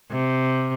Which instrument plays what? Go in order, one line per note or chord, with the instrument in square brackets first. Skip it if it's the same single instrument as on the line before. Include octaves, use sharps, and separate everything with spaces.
[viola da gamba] C3